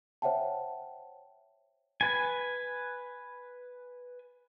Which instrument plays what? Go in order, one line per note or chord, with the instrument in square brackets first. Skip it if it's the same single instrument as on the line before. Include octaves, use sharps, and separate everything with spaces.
[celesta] C5 C#5 E5 F#5 G5 A5
[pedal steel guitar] B4 G#5